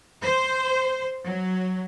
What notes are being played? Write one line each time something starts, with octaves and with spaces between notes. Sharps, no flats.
C5
F#3